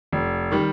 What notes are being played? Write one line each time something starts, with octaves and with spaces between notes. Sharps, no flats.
F1
D#3 G3